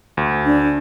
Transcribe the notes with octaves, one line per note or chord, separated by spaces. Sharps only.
D2
D4